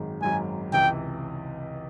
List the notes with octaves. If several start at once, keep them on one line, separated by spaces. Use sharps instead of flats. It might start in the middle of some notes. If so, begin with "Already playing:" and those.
Already playing: G#1 F#2 D#3 G#3
G#1 F#2 D#3 G#3 G#5
C#2 C3 E3 G5